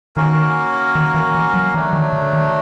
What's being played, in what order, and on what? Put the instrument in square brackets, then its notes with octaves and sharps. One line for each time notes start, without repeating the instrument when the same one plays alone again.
[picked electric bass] D#3 [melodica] A#3 C#4 F#4 A#4
[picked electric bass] D#3
E3
E3
F#3
[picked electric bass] E3 [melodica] F#3 A3 D4
[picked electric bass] D#3
D3
D#3